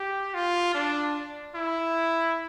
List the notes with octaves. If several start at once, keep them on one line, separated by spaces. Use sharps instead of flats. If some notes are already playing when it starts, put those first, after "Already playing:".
Already playing: G4
F4
D4
E4